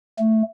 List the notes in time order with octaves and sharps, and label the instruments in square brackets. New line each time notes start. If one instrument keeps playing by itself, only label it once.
[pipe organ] A3